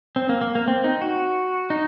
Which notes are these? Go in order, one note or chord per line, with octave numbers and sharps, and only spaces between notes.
C4
A#3
A#3
A#3
C4
D#4
F#4
D#4